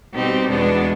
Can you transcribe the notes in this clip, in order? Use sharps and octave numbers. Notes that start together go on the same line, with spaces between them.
B2 G3 C4 D#4 G4
E2 B2 G#3 B3 D4